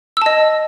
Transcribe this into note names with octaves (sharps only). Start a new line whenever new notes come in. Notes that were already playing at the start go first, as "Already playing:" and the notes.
D#5 A5 E6